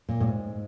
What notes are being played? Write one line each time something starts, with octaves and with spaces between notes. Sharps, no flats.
A#2
A2
G#2